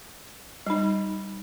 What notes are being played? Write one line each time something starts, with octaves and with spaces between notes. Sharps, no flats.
G3 D#4